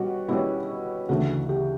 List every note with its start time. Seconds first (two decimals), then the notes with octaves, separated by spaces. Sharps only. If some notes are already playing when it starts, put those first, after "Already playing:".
Already playing: B2 G3 C#4 F#4
0.28 B2 G3 C#4 E4
1.09 D2 C#3 E3 A3 F#4
1.49 G4